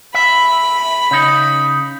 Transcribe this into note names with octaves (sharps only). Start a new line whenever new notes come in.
E5 B5
C#3 D#4